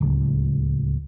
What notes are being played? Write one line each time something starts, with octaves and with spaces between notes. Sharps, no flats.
D1 C#2